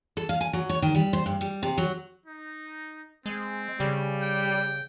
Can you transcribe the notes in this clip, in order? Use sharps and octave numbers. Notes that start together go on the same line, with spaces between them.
A4
F5
G#5
F#3
C#5
D#3
G3
C5
G2
G3
C3
F#3
D#4
G#3 C4
C#3 G3
G5